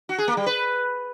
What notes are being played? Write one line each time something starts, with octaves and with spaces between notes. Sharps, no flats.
F#4
G#4
A#3
G3
B4